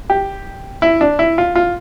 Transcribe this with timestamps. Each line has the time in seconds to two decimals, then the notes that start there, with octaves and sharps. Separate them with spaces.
0.10 G4
0.82 E4
1.01 D4
1.19 E4
1.38 F4
1.55 F4